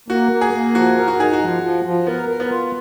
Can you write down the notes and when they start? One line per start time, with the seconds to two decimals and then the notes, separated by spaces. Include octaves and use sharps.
0.08 A#3 F#4
0.32 A#3
0.41 G#4
0.54 A#3
0.74 F3 F#4
0.98 A#4
1.08 F#4
1.18 D#4 G#4
1.33 F#4
1.41 F3
1.62 F3
1.85 F3
2.07 B3 A#4
2.29 A#4
2.40 B3
2.50 F4